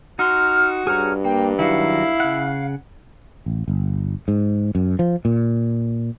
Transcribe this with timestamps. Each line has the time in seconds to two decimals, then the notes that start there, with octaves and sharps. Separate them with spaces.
0.19 D#4 F#4 C6 F6
0.87 G2 G#4 C#5 A#5 F6
1.25 A#3 G5
1.59 D#3 F#3 E4 F#4 F5
2.20 C#3 F#5
3.46 A1
3.68 G1
4.28 G#2
4.75 F#2
4.99 F3
5.25 A#2